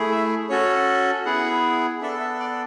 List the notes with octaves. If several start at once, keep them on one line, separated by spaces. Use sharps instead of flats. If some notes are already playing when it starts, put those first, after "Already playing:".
Already playing: A3 E4 G#4
E5
C#4 F#4 A4 C#5
B3 E4 G#4 F#5
B3 D4 A4 E5
E5
D5